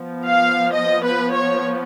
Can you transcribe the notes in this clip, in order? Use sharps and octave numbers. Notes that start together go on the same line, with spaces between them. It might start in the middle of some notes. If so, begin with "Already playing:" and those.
Already playing: F3 B3
F5
D#5
B4
C#5